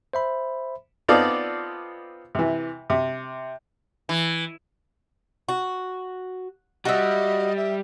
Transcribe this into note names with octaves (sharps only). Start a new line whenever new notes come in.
C5 E5 B5
B3 C4 D#4 F4 A4 D5
C3 E3
C3
E3
F#4
G3 F#4 D#5 E5
E5